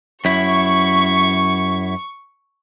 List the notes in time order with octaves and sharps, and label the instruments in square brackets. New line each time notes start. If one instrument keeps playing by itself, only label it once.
[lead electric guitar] F#2 E4 [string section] C#6